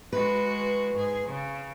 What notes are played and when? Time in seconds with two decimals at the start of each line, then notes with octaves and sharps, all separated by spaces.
0.13 G#3 F#4 B4
0.94 G#2 G#4
1.27 C#3